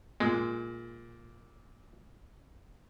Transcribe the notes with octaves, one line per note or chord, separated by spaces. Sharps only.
A#2 G#3